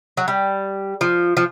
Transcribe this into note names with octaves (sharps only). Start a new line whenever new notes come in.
F#3
G3
F3
F3